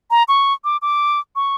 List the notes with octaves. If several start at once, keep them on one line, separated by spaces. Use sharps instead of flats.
A#5
C#6
D6
D6
C#6